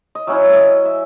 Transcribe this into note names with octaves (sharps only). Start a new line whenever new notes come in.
D#5
F#3 C#4 E4 E5
D#5 E5
E5